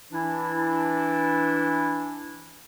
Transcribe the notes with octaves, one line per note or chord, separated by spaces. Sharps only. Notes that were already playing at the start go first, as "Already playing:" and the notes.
E3 D4 E4